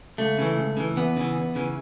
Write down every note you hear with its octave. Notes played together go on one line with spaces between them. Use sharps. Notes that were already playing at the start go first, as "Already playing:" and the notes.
C#2 A3
C#3 E3
C#2
C#3 E3
E2 B3
C#3 E3
E2
C#3 E3